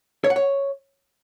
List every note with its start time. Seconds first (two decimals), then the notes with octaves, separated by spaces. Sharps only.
0.24 C#5
0.30 F#5
0.36 C#5